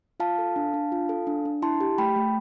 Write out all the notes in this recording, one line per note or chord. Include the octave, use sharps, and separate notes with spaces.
F4 F5 A5
A4
D4
D4
F4
A4
D4
D4
E4 A5 C6
G4
A3 G5 B5
A3